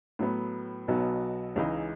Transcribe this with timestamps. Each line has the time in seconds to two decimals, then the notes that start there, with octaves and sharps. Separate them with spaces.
0.19 A2 F#3 B3
0.88 B1 B2 F#3 B3
1.56 C#2 C#3 E3 G#3 D#4